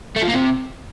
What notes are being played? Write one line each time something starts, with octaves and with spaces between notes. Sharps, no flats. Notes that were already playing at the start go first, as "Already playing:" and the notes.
A3
F3
A#3
C3